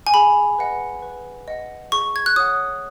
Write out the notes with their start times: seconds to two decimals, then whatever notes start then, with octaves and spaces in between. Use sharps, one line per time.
0.07 G#5
0.14 G#4 B5
0.59 B4 D#5 F#5
1.02 B4
1.48 D#5 F#5
1.92 G#4 C#6
2.16 G#6
2.26 F#6
2.36 C#5 F#5 D#6